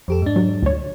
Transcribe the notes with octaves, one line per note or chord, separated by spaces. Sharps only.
F2 G4 A4
G#2 D4
F#3
D2 C#5